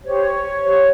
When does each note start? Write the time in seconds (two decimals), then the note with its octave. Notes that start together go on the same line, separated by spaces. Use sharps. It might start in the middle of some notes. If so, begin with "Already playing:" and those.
0.03 G4 C5 C#5
0.62 G4 C5